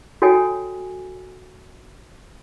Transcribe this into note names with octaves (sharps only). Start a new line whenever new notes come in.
F#4 A4 C#5 G5 G#5